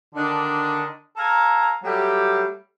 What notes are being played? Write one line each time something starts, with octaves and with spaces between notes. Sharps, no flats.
D3 D#3 D4
A4 F5 G#5 A#5
F#3 G3 A3 G4